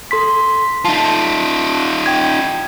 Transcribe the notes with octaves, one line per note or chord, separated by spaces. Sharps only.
A4 C6 B6
D#4 F4 A5
G5 G#6